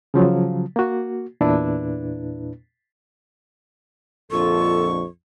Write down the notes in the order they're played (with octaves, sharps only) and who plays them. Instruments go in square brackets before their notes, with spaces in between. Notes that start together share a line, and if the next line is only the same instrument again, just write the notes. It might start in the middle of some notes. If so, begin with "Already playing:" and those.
[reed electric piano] C#3 F3 F#3
A#3 F#4
E2 A#2 D4 E4 B4
[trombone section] A#1 F2 D3 [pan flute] F4 [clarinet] A4 [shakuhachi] C#6